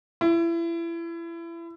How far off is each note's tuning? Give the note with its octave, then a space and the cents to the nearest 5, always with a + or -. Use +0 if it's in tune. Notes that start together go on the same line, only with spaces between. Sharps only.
E4 +30